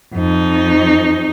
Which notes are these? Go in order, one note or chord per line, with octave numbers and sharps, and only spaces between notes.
F2 D#4